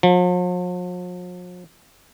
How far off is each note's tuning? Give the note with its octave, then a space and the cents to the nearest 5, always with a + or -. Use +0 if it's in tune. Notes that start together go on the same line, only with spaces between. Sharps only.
F3 +45